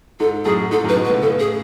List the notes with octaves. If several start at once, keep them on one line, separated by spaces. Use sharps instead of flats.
G#2 A4
F#2 A2 G#4
G#2 A4
F#2 A2
B4
G#2 B2
B4
A2 C#3
A2 C#3 A4
G#4